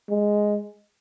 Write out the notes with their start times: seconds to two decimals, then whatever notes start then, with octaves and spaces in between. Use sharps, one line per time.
0.10 G#3